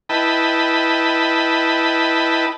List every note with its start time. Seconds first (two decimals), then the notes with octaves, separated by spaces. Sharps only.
0.09 E4 B4 D#5 G5 A5 B5